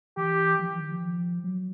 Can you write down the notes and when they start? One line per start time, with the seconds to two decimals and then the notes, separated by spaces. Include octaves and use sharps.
0.17 E3 G4
0.59 F3
0.69 E3
0.80 D#3
0.92 F3
1.44 F#3